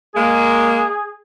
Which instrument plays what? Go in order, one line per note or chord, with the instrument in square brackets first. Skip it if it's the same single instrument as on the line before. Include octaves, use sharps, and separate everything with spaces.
[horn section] G#3 A#3 [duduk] G#4